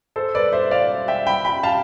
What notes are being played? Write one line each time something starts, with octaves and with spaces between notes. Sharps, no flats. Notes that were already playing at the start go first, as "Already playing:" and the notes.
A4 C5
B4 D5
C5 E5
D5 F5
E5 G5
G5 B5
G5 B5
F5 A5